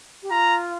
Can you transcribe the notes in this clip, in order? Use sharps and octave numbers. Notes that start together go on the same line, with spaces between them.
G4
F4 A#5